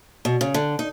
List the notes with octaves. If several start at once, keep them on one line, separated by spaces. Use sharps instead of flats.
B2
C#3
D3
D#4